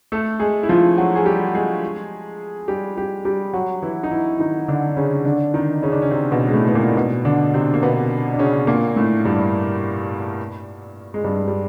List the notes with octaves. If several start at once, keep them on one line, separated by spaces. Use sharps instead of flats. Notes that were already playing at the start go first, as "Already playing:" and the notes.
A3 A4
G#3 G#4
E4
F3 F4
F#3 F#4
G#4
G3 G4
G#3 G#4
G3 G4
G3 G4
G3 G4
F#3 F#4
E3 E4
D#4
E3 E4
D#3 D#4
D3 D4
C#3 C#4
D3 D4
D#3 D#4
C#3 C#4
D4
C#4
C3 C4
B2 B3
G#3
A2 A3
B3
A#2 A#3
B2 B3
D3 D4
C3 C4
A#3
B2 B3
D4
C#3 C#4
A#2 A#3
A2 A3
G2 G3
G#3
G2 G3
G3